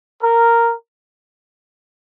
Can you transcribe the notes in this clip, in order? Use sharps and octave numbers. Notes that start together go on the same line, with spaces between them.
A#4